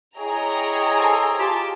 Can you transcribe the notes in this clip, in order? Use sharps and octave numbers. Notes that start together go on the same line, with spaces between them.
E4 G#4 C#5 D#5 G5 A#5
A4 C5 G#5
F4 G4 A5